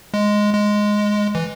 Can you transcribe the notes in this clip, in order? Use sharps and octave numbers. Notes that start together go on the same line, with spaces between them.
G#3
G#3
E3